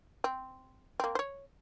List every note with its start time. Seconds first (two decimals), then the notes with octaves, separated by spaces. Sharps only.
0.24 C4
1.00 A#3 C4
1.15 C5 C#5